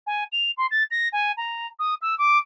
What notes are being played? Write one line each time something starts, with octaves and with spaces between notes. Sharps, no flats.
G#5
F7
C6
A6
A#6
G#5
A#5
D#6
E6
D6